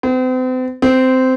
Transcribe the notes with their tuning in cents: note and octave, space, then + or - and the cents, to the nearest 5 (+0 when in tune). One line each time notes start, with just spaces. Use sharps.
C4 -40
C4 -15